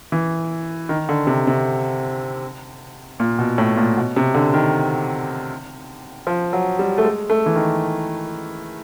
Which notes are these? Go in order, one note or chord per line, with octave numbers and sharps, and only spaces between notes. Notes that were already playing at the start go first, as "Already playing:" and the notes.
E3
D#3
D3
C3
C3
A#2
B2
A2
A#2
B2
C3
D3
D#3
F3
F#3
G3
A3
G#3
A3
E3
D#3